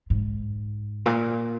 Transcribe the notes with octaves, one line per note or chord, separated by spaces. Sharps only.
G#2
A#2